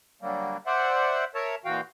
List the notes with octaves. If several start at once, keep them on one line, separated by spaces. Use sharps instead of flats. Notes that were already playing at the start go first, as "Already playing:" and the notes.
D3 F#3 G3 A#3
C5 D5 E5 F#5
A#4 C#5 E5 A5
A#2 E3 F#4 F5 G5